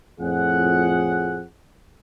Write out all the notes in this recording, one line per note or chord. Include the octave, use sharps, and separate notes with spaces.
F2 A2 G#4 F#5